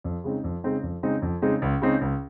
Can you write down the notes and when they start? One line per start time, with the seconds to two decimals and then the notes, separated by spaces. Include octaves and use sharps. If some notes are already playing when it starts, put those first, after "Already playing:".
0.04 F2
0.24 C#3 G#3 C4 D#4
0.44 F2
0.64 C#3 G#3 C4 D#4
0.83 F2
1.03 C#3 G#3 C4 D#4
1.22 F2
1.42 C#3 G#3 C4 D#4
1.62 C#2
1.82 C#3 G#3 C4 D#4
2.01 C#2